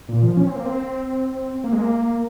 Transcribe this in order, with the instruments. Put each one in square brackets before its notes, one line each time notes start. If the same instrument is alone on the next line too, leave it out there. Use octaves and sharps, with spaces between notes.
[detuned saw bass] A#2
F3
C#4
C4
A#3
C4
A#3
G#3
A#3